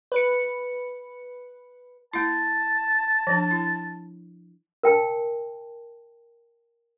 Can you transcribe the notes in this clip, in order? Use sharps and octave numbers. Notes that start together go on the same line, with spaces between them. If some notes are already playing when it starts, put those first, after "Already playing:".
B4 C#7
A#3 E4 A5
F3 D4
E4
A#4 G5 A5